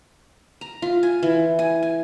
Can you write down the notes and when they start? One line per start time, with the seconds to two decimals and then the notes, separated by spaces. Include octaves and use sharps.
0.61 A#5
0.82 F4
1.03 G#5
1.23 E3
1.59 G#5
1.83 G#5